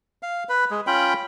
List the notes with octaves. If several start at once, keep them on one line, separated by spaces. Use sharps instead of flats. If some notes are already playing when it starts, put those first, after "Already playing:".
F5
B4
G#3
C#4 F4 G5 B5